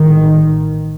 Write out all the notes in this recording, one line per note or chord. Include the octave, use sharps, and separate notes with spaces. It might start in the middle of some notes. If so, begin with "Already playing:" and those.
Already playing: A1 A2 D#3